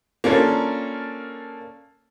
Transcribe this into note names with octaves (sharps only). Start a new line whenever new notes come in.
A#3 C#4 D4 F4 A4